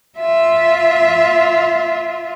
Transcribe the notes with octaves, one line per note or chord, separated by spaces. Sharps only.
F4 E5